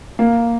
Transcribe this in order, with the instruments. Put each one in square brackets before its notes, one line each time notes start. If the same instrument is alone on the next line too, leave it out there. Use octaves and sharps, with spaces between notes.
[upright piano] A#3